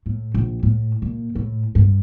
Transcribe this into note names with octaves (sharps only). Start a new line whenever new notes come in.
A2
A#1
A2
A#2
A2
G2